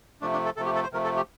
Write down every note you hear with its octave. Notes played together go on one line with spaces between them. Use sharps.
C3 F3 A3 D4
D4
A4
C3 F3 A3 A4
G4
A4
C5
C3 F3 A3 A#4
A4
G4